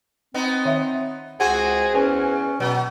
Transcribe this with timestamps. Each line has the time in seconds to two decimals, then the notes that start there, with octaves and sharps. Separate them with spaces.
0.34 B3 C4 D#4
0.65 D#3 E5
1.40 C#2 C4 F#4 G#4 C5 F#5
1.95 E2 C#4 G#5
2.60 B2 F#3 B3